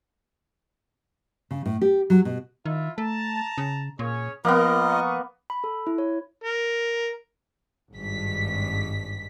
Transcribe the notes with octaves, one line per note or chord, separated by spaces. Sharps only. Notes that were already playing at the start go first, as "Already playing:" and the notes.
C#3
A2
G4
F#3
B2
D#3 E4 F4 E5
A3 A5 A#5
C#3
A#2 C#4 G#4 C#5
F3 A#3 B3 F4 A#4 D#5
C#6 D#6
B5
A4
E4
C#5
A#4
G#1 G2 B6